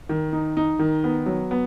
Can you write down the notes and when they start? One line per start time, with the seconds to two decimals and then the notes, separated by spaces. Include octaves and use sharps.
0.09 D#3
0.33 D#4
0.57 D#4
0.79 D#3
1.04 B3
1.26 F#3
1.51 B3